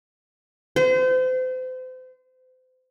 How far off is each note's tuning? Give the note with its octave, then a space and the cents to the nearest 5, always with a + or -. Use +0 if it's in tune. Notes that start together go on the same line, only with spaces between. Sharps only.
C5 -35